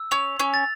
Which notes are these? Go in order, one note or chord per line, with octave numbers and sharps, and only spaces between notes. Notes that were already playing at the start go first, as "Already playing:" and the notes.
Already playing: E6
C#4 F7
C#4
A6